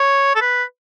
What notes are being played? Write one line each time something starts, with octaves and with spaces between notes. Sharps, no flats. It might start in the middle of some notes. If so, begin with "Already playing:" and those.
Already playing: C#5
A4
B4